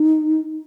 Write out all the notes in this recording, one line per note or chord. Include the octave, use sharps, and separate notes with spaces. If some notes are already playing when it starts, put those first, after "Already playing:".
Already playing: D#4